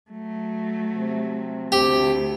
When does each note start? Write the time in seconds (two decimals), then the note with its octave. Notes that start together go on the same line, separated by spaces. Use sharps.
0.11 F#3 A3
0.97 C3
1.72 D2 A3 C4 G4